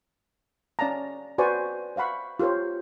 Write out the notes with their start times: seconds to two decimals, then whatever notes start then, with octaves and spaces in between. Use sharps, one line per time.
0.79 C#4 D5 F5 A5 A#5
1.38 F#4 B4 C5 D5 G#5 C#6
1.96 C5 F5 F#5 B5 C#6
2.40 F4 G4 A#4 C5 C#5